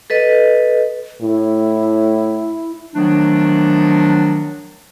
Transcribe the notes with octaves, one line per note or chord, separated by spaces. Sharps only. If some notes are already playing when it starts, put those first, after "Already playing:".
A4 B4 D#5
A2 E4
D#3 F3 F#3 A3 B3 D4